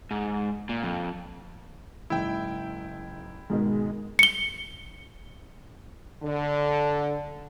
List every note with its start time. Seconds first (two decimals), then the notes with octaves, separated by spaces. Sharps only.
0.11 G#2
0.69 A#2
0.83 F2
2.10 F#1 G#2 E4 G5 E6
3.50 G#2 B2 D#3 G#3
4.19 C#7 G7
6.23 D3